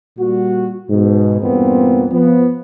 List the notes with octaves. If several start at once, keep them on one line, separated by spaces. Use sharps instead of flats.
A#2 G3 F#4
G#2 B2
E2 G2 A#2 B3 C4
F3 B3